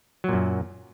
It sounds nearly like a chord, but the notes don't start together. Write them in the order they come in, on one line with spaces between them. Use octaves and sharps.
F#3 A#2 F#2